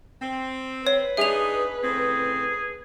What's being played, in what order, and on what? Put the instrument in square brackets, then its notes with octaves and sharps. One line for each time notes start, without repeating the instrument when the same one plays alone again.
[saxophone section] C4
[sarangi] B4 [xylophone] C#5
[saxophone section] D4 D#4 G#4 [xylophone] E5 F7
[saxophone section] A2 C#3 C4 [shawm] G#4